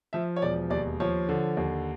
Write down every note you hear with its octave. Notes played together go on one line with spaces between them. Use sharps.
F3 E5
C#5
E1 D5
D#2 D5
F3 C#5
D3
D#2